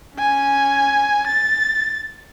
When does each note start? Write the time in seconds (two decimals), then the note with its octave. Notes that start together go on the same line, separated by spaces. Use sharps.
0.17 C#4 G#5
1.27 A6